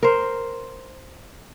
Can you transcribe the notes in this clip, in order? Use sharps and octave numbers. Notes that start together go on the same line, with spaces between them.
A#4 C5